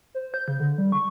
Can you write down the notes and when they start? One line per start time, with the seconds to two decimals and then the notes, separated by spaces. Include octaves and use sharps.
0.15 C5
0.34 G6
0.48 C#3
0.60 D3
0.78 G3
0.92 C#6